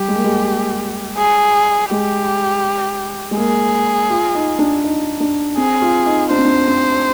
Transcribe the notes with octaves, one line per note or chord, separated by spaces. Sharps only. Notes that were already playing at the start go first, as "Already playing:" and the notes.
Already playing: G3 G4
G#3
A#3
G#3
G#4
G#3 G4
G#3
A#3 G#4
F4
D#4
D4
D#4
D4
C4 G#4
F4
D#4
D4 C5
C4
D4
C4